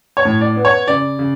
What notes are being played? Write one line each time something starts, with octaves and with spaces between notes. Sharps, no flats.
C#5
A2
D5
B3
C#5
C#3 D5
C#3